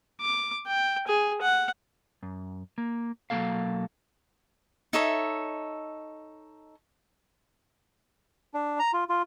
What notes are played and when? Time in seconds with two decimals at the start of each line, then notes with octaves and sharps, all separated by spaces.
0.21 D6
0.66 G5
1.08 G#4
1.41 F#5
2.23 F#2
2.78 A#3
3.30 B1 F#3 G#3 A#3 A4 F5
4.93 D#4 A4 C#5 E5
8.54 D4
8.79 A#5
8.93 F4
9.09 F4